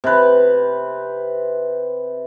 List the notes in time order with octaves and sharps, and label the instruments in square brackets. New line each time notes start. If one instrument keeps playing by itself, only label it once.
[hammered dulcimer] C3 B4